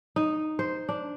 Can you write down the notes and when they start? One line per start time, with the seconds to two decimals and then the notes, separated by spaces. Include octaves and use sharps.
0.16 D#4
0.59 C5
0.89 D4